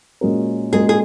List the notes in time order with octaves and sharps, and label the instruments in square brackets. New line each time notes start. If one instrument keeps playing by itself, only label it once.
[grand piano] A#2 G#3 C#4 F#4 A#4
[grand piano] A#2 G#3 C#4 F#4 A#4 [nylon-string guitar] G#4
[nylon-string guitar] G#4